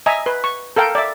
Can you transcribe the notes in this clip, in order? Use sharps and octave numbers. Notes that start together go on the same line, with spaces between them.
D#5 E5 G#5 A#5
B4
C#6
A4 A#4 F5 G5
D5 E5